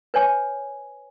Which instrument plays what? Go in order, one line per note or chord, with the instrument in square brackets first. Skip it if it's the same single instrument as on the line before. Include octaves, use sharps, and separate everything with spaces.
[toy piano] B4 C#5 G#5